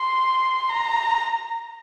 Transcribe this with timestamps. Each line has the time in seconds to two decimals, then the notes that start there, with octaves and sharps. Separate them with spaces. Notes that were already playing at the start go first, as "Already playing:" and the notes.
Already playing: C6
0.70 A#5